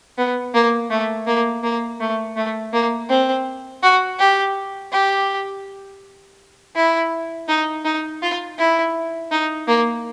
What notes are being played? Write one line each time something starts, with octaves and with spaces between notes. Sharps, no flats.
B3
A#3
A3
A#3
A#3
A3
A3
A#3
C4
F#4
G4
G4
E4
D#4
D#4
F4
E4
D#4
A#3